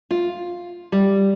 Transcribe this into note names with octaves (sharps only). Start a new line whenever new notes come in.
F4
G3